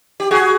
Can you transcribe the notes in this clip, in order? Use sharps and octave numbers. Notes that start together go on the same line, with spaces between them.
G4
F#4 G#4